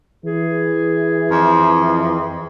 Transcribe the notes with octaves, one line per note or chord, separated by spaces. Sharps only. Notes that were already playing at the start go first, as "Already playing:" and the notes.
E3 G#4
F2